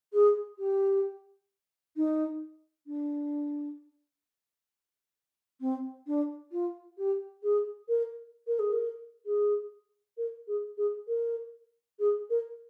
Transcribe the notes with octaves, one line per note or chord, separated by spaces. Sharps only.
G#4
G4
D#4
D4
C4
D4
F4
G4
G#4
A#4
A#4
G#4
A#4
G#4
A#4
G#4
G#4
A#4
G#4
A#4